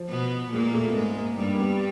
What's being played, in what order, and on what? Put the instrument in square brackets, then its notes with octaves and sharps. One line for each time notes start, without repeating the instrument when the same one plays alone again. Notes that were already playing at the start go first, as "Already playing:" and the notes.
Already playing: [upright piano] F3
[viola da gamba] B2 B3
[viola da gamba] A#2 A#3 [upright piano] G#3
[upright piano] A3
B3
[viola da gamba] G#2 G#3 [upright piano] A#3
[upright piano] A#3
[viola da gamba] G2 G3 [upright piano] A#3
[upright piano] A#3
B3